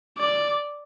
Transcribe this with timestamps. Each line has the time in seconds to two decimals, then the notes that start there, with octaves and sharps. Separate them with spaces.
0.18 D5